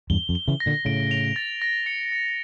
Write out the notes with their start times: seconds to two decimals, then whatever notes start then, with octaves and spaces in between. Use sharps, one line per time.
0.10 E2 G2 G7
0.29 F2
0.35 G7
0.48 C#3 E3
0.60 A#6
0.66 A#2 D3
0.85 A2 C#3 D7
1.11 F7
1.36 A6
1.62 A#6
1.86 C#7
2.12 C#7